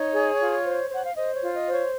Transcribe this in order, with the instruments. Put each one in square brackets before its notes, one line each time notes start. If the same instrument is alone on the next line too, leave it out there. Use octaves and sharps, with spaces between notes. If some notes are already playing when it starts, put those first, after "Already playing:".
Already playing: [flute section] D#4 C#5
G#4
F4
C5
C5 F#5
F5
C5 D#5
C#5
F4
D#5
C5
C#5